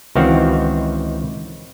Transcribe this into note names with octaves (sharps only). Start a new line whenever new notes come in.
C#2 D#3 E3 C4 F#4 F5